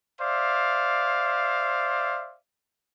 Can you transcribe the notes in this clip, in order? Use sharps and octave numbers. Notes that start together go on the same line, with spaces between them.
C5 D5 E5 F5